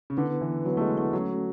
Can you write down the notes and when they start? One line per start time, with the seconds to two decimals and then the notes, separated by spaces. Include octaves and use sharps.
0.10 C#3
0.17 D3 B3 E4 B4 F#5
0.41 E3
0.65 F#3 B3 E4 B4 F#5
0.77 A3
0.81 G#3
0.98 A3
1.13 F#3 A3 C#4 F#4 A4